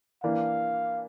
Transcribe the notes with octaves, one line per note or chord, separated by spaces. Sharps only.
E3 A#3 D4 F5